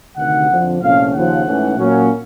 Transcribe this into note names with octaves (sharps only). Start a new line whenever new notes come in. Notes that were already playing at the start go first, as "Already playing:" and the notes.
D2 C3 D#3 F#5
F2 D3 F3
C2 A#2 F3 A3 C#4 F5
D#2 C#3 F3 F#5
G#2 E3 A3 C#4
A#2 F#3 A#3 C#4